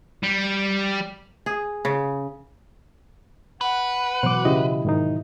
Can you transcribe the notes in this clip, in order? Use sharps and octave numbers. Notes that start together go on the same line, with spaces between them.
G3
G#4
C#3
B4 F#5
B2 E3 F#3 C5 D6
C#3 E4 G4 D#5
G#2 D#3 D#4